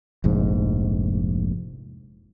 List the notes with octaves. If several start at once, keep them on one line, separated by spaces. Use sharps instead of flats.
F1 A#1 G#2